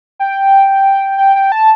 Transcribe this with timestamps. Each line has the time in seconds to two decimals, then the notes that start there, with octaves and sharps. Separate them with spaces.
0.19 G5
1.18 G5
1.36 G5
1.52 A5